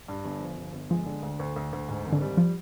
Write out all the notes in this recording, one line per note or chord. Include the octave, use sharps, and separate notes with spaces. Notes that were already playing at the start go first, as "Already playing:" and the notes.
G2
G1
F3
G1
G1
F3 G#3
D3
D2
D2
D2
D2
G#2
G#1
D3
G3
F3